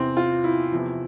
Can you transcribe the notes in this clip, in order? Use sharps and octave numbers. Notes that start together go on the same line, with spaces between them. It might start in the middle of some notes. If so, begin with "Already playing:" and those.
Already playing: E2 C3 E3 C4
F4
E4
E2 C3 F3